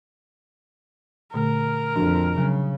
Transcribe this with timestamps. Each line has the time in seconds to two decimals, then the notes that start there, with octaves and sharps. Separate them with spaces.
1.34 A#2 D3 A3 A#4
1.96 F2 F3 D4 F#4
2.38 C#3 F#3